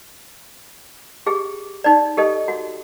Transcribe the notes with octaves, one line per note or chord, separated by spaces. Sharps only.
G4 G#4
D#4 D5
G4 A4 D#5
F#4